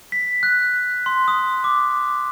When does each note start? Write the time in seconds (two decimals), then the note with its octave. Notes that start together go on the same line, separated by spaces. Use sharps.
0.12 B6
0.43 F#6
1.06 C6
1.28 D#6
1.64 D6